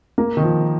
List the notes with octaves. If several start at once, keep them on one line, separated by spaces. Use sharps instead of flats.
A#3
D#3
F3